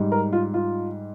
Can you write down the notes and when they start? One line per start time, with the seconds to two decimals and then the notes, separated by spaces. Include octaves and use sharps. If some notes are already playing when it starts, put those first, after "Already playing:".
Already playing: G#2 G3
0.12 A#4
0.33 F4
0.54 F4